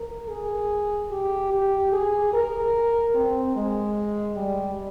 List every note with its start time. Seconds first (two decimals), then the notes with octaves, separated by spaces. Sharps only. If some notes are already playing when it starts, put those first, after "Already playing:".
Already playing: A#4
0.29 G#4
1.11 G4
1.52 G4
1.92 G#4
2.33 A#4
3.14 C4
3.55 G#3
4.36 G3